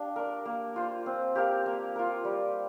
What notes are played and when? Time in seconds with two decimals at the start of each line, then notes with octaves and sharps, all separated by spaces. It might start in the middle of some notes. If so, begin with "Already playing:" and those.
Already playing: D4 G4 F5
0.16 A#4 D5
0.46 A#3
0.76 F4 C5
1.06 C4
1.35 G4 A#4 F5
1.66 A#3
1.96 F4 A#4
2.25 G3